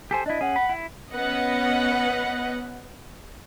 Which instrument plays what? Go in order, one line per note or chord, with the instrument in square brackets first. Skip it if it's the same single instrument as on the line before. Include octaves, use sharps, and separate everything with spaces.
[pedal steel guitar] G4 A4 C5 [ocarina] G#5
[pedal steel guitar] D4 E4 [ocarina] D#5
[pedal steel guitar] C#4 G#4 [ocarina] F#5
[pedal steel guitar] B5
E4
[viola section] B3 C#4 B4 D#5 F#5